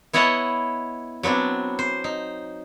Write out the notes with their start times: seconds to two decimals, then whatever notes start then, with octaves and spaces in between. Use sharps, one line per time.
0.13 B3 E4 C#5 D#5 F#5 A5
1.23 F#3 B3 C4 D4
1.79 C5
2.04 D#4